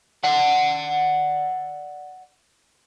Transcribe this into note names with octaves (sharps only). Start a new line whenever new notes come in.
D5 F#5